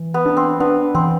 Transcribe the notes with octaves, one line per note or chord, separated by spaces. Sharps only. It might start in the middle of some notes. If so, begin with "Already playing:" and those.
Already playing: E3
B3
D4
C4
B3 D4
E3 C4